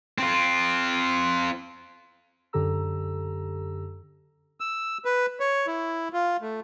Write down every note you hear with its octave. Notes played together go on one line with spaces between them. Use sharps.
C4 F4
F#2 D3 G4 A4 A#5 E6
E6
B4
C#5
E4
F4
A3